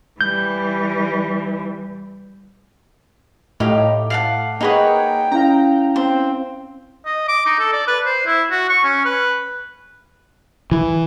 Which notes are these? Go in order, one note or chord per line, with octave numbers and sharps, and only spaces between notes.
E3 G3 G6
A2 D#4 G4 F5 D6
F5 F#5 A5
A#3 D#4 G#4 B4 C#5 F#5 G5
C#4 E4 F5 A#5
C4 C5
D#5
D6
D#4
A4
D5
B4
C5
E4
F#4
C#6
C#4
B4
E3